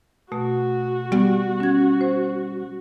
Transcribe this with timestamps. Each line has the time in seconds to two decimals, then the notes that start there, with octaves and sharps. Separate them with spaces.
0.32 B2 A3 F#4
1.12 G3 B3
1.60 C#4 G#6
2.01 C5